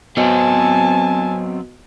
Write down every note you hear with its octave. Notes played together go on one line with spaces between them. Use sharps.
F#3 B3 C4 F#4 D#5 G#5 A5